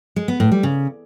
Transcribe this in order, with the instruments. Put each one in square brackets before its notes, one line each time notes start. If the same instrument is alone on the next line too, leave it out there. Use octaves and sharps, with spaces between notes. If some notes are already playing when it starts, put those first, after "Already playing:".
[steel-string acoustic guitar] G#3
B3
A2
G3
C#3